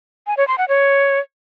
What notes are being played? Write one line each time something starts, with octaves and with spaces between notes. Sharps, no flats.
G#5
C#5
C6
F#5
C#5